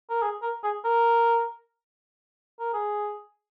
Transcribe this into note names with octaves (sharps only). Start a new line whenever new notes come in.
A#4
G#4
A#4
G#4
A#4
A#4
G#4